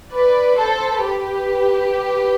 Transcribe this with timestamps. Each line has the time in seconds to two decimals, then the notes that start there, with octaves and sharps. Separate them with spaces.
0.13 B4 D5
0.57 A4 C5
1.02 G4 B4